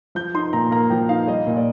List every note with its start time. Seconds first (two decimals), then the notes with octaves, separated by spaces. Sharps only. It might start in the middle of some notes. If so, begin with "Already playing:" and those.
0.15 F3 G6
0.34 D#4 C6
0.53 A#2 A#5
0.71 A#3 A#5
0.90 F3 G5
1.09 D#4 F5
1.27 G3 D#5
1.47 A#2
1.56 D5